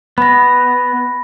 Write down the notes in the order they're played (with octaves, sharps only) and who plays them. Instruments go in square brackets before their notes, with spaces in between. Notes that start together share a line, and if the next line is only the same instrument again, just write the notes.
[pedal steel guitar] B3 [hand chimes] B5 A#6